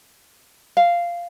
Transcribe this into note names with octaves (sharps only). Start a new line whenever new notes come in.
F5